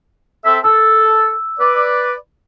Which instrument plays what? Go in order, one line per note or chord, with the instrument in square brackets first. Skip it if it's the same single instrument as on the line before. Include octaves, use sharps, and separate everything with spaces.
[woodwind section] C4 A4 E5
[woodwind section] A4 [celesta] E6
[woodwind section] B4 D5